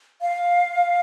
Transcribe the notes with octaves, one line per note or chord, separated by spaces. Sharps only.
F5